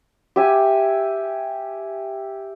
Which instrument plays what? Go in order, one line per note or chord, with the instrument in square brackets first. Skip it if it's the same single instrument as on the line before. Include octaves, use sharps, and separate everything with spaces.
[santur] G4 E5 G#5